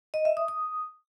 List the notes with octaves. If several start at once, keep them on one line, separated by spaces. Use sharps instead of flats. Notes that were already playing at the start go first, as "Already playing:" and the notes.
D#5
E5
D#6
D#6